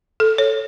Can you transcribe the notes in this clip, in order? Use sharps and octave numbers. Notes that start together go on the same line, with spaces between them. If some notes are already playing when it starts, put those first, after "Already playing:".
A4
C#5